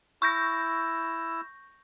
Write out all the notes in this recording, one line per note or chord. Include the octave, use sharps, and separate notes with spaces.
E4 C#6 E6 G6 A#6